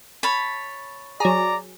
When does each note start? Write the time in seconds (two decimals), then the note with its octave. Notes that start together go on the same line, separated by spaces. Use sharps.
0.23 C#5 A5 B5
1.20 F#3 G#4 D5 A#5